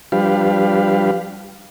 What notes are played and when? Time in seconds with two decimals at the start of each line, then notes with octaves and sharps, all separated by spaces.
0.12 F3 G3 D4 G4 B4 F5